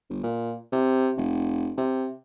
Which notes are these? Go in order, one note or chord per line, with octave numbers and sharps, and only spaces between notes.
G1
A#2
C3
F1
C3